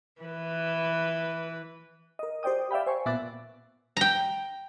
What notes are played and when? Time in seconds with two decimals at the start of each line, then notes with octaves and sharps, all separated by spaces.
0.21 E3 B4
2.19 A#4 D#5
2.43 G4 C5 D5 G5 D#6
2.71 D5 E5 F5 G5 B5
2.86 C5 G#5 C#6
3.06 A#2 B3 E5 D6 F#6 A6
3.97 G5 A#5